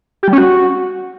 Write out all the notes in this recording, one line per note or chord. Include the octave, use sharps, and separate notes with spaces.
G4
G3
C#4
F#4